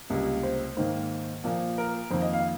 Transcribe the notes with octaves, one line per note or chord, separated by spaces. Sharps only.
C#2 C3 G3 A#3
C5
G#2 D#3 A#3 C5
A#2 F3 A#3
A#4
F2 D#3 A#3 C5
D#5
F5